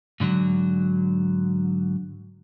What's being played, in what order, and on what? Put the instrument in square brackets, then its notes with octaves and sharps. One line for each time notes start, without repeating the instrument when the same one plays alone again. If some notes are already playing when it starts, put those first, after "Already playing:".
[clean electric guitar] G#2 D3 E3 F#3